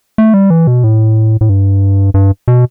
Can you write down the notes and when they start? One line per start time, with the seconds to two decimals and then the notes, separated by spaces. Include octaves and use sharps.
0.18 A3
0.34 G3
0.50 E3
0.67 B2
0.84 A2
1.41 A2
1.49 G2
2.14 G2
2.48 B2